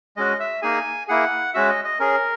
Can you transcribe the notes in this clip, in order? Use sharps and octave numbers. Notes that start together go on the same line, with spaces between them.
G#3 C#4 F#4 D#5
E5
A#3 D#4 G#4 G#5
A#3 E4 G#4 F#5
G#3 C#4 F#4 E5
D#5
D#5
C#4 G#4 A#4